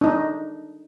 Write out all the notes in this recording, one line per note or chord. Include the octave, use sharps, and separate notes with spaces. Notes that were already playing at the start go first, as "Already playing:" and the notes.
D4 D#4